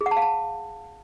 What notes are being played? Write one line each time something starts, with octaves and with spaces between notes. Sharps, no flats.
G#4
F#5
A5
F5
A5